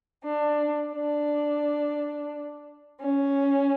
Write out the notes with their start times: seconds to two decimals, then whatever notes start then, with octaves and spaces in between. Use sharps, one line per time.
0.23 D4
0.93 D4
3.00 C#4